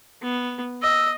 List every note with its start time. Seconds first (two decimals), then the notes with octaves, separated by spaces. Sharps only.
0.22 B3
0.82 D#5 E6